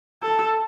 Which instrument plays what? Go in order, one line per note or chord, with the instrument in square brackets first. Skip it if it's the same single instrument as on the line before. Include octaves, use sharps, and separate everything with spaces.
[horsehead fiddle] A4